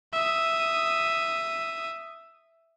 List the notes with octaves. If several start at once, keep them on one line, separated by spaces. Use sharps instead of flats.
E5 D#6